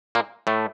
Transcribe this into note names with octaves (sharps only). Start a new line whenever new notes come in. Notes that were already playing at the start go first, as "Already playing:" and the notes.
A#2 A#3
A2 A3